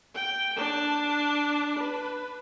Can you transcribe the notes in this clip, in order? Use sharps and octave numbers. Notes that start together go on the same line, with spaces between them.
G5
D4 A5
B4